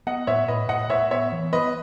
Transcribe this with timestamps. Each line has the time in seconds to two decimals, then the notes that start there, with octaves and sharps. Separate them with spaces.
0.07 B3 D#5 F#5
0.27 A2 C#5 E5
0.48 A2 B4 D#5
0.69 A2 D#5 F#5
0.90 A2 C#5 E5
1.11 B3 C#5 E5
1.32 E3
1.53 B3 B4 D#5